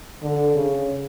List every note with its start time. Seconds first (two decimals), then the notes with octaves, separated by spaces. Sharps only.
0.23 D3
0.55 C#3